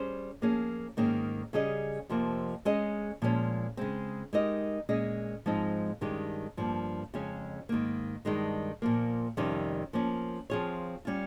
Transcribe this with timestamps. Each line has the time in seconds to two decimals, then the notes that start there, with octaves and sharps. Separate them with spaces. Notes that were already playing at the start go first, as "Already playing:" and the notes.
Already playing: G3 C#4 G#4 C5
0.42 F3 A#3 C#4 G#4
0.97 G#2 D#3 A#3 C#4 G#4
1.53 C#3 G3 C#4 G#4 D#5
2.09 F2 C3 F3 A#3
2.65 G#3 C#4 G#4 D#5
3.22 A#2 F3 G#3 C#4
3.77 C#3 G#3 C4
4.33 G#3 D#4 G4 A#4 D#5
4.89 A#2 G#3 C#4 G#4 D#5
5.46 G#2 F3 G#3 C4 D#4
6.01 G2 D#3 G#3 C#4 G4
6.57 G2 F3 A#3
7.14 F2 C#3 G#3 C#4
7.69 G#2 D#3 A#3
8.25 G2 D#3 G#3 D#4
8.82 A#2 F3 A#3
9.37 F2 C3 D#3 G3 C#4
9.93 F3 A#3 C#4
10.50 F3 C4 F4 G#4 C#5
11.05 G3 C#4 F4